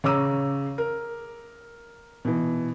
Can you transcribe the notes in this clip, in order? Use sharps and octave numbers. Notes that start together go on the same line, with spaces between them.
C#3 C#5 A#5 D6 E6 D#7
A#4
B2 E3